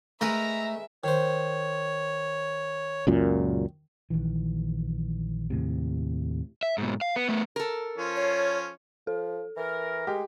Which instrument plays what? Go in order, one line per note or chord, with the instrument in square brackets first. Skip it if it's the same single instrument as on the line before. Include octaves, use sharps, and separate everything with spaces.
[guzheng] G#3 A#4 B4 [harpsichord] A3 [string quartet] E5 [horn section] A#5
[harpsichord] D#3 C5 [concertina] C#5
[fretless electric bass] C#2 F#2 A#2
[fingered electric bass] A#1 D#3 E3
D#2 A2 C3
[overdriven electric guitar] E5
G#2 B2
F5
B3
A3 B3
[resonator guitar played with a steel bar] A4 A#4
[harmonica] F3 C#4 F4
[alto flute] C#5
[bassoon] F3 [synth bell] A4
[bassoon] E3 [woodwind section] A#4
[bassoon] G#3 [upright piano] G4